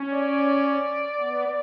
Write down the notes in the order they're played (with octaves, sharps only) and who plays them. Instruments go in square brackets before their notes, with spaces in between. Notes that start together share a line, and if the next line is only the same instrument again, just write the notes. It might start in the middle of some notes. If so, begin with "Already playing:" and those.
Already playing: [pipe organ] C#4
[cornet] D5
[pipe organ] B3